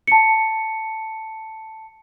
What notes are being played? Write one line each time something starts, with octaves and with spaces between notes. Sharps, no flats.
A5 C#7